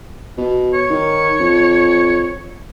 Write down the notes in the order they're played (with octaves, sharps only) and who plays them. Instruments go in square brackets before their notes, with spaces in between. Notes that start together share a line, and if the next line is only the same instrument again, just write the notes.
[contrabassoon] B2
[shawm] C#5
[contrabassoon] D#3
F2